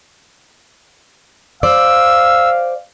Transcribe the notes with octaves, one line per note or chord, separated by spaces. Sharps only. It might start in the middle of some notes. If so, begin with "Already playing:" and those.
C5 D5 F5 E6